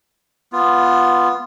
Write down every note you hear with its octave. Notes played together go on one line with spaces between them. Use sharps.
B3 F4